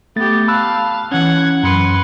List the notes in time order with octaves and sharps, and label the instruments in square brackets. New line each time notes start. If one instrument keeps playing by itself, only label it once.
[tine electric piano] A3 A6 [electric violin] B3 G4
[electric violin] F5 A5 [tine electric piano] B5 E6 F#6
[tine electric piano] E3 C#4 [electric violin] F#5 G#6
[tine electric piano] F#2 C#7 [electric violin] B4 C6